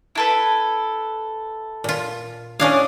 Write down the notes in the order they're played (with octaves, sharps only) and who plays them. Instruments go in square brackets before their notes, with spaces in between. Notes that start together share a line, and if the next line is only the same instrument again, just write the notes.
[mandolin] E4 A4 B4
[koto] A#2 F4
[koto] C#4 D4 F5 [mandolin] E4 G#4